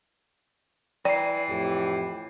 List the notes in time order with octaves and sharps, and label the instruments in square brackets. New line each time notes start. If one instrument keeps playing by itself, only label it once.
[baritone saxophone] E3 [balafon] D5 [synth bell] G5 C7
[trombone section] F2 A2 G4